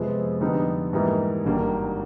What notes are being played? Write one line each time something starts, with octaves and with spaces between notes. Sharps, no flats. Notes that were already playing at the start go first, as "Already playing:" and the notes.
Already playing: F2 C3 F3 G#3 B3
F2 D3 G3 B3 D#4
G#2 E3 G3 A#3 D#4
G#1 G2 D#3 G3 A#3